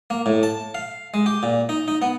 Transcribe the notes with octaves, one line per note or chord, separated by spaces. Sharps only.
A#3
A2
A5
F5
G#3
G4
A#2
D#4
D#4
B3